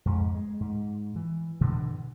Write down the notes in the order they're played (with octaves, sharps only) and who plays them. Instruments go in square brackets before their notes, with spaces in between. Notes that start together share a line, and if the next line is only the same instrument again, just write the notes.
[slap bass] F2 G#2
G#3
G#2
E3
G2 B2 D3 E3